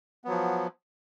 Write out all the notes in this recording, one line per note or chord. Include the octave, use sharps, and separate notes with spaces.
F3 F#3 B3